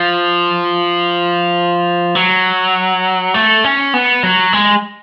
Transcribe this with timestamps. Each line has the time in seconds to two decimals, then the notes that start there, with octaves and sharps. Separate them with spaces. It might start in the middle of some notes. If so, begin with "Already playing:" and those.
Already playing: F3
2.15 F#3
3.34 A3
3.64 C#4
3.94 B3
4.23 F#3
4.53 G#3